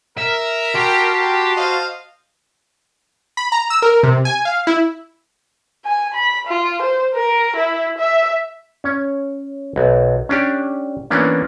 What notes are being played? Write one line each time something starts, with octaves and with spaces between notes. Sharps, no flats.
A#4 E5
F#4 G4 A5 C6
C5 D#5 F5
B5
A#5
E6
A#4
C3
G#5
F5
E4
G#5
B5
F4
C5
A#4
E4
E5
C#4 C#5
B1
C#4 D4 G4
E3 A#3 B3 C#4 D4